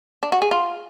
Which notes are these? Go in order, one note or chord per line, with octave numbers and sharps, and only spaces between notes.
D4
F#4
G#4
F4